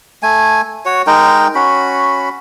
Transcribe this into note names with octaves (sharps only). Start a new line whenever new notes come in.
A3 G#5
F#4 C#5
G#3 D#4 A#4 G5
C#4 F#4 B5